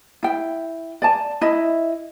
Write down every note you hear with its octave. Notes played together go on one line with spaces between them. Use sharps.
E4 G5
D5 G#5 A5
E4 D#5 B5